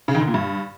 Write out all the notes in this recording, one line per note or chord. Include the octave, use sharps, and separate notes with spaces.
C#3
D#3
D3
A#2
G2